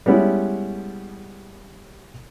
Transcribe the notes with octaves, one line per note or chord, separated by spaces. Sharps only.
G3 G#3 B3 C#4 E4